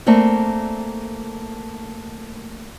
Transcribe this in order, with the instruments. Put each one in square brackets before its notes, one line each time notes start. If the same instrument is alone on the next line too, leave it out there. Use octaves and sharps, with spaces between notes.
[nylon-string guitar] A3 A#3 C4 D5